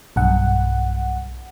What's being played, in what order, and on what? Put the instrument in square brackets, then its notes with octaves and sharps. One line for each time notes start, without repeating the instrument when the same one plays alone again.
[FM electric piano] B1 G2 F#5